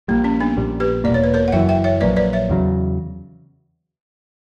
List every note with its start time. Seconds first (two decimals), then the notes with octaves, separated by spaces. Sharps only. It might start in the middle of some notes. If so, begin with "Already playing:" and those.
0.08 A#1 A#2 G3 A#3
0.24 C#4
0.40 B3 D4
0.57 A#1 A#2 G3
0.80 G4 B4
1.04 E1 E2 B2 A#3 D5
1.14 C#5
1.24 B4
1.34 A#4 C#5
1.48 F#5
1.52 F#1 F#2 E3 E5 G5
1.69 E5 G5
1.84 C#5 E5
2.01 A#1 A#2 F#3 A#3 B4 D5
2.16 B4 D5
2.33 C#5 E5
2.49 E2 C#3 F#3